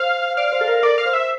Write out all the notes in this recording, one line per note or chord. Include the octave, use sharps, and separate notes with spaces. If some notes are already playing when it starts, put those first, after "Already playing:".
Already playing: C5 F5
D5 F5
C5
A4
A#4
A#4 D5
F5
C5
E5